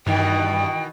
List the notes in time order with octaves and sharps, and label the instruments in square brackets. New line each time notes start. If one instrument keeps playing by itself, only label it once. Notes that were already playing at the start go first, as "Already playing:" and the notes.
[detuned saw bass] G2 [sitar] B2 D#3 E3 [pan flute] G5